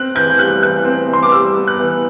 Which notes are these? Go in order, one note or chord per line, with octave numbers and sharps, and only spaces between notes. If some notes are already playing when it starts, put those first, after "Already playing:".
Already playing: C4 F#6
E3 G6
G3 F#6
E3 F#6
C4
E3
C6
D6
G3 E6
B3
F#6
E3